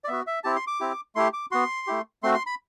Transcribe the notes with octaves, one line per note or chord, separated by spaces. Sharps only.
D5
B3 F#4 E5
E5
C4 E4 G4 A5
C6
D6
C4 E4 G4
A3 E4 G4 C6
D6
B3 F#4 C6
A3 E4 G4
A3 C4 F#4 C6
C6
B5